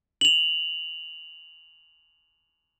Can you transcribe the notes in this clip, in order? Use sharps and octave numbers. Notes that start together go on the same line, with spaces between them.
F7 F#7